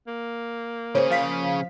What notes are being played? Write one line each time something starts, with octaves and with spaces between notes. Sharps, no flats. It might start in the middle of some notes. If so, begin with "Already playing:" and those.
A#3
C#3 C#4 G#4 C5 C#5
F3 F5 B6